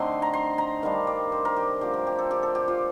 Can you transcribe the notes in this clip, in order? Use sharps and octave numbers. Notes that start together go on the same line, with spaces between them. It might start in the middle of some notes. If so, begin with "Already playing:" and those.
Already playing: D3 A3 C4 D#4 C6
A#5
C6
A#5
D#3 G3 D4 F5
D5
C5
A#4
G4
D3 F3 A3 G4
A#4
G4
A4
G4
A4
G4
F4